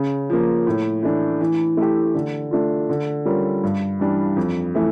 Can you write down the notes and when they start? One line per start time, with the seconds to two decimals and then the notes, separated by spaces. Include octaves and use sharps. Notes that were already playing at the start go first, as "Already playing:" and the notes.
Already playing: C#3
0.30 F3 A#3
0.67 A2
1.03 E3 A3 D4
1.40 E3
1.77 A3 E4 G4
2.15 D3
2.51 A3 D4 F4
2.89 D3
3.25 G3 C#4 F4 A#4
3.63 G2
4.00 E3 G3 D4
4.36 F2
4.75 E3 A3